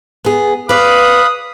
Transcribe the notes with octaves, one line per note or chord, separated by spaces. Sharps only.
B3 G#4
B4 D5 F5 B5 D#6 F#6